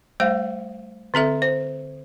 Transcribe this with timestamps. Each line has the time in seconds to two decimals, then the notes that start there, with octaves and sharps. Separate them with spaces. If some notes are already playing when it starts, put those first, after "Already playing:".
0.20 G3 A3 C5 F5
1.14 D3 C4 A4 E5
1.42 C5